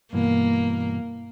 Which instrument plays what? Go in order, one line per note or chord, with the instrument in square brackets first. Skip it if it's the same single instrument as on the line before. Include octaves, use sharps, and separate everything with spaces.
[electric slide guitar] G2 B2 E3 [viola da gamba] A#3